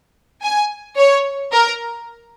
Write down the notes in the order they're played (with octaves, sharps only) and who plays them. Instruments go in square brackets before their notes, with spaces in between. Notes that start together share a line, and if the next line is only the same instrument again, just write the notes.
[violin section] G#5
C#5
A#4